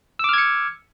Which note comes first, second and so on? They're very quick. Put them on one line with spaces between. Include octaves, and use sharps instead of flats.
E6 D6 F6 G#6 C#7